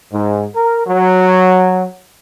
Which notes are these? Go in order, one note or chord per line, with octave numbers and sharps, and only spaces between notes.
G#2
A#4
F#3